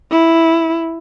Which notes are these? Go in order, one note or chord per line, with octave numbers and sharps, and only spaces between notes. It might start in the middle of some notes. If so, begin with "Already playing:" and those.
E4